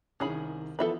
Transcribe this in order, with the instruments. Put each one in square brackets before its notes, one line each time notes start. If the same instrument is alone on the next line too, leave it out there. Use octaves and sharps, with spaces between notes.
[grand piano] C2 D#3 [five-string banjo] C#4 G#4 B5
[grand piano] E3 F3 B3 [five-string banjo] A4 E5 B5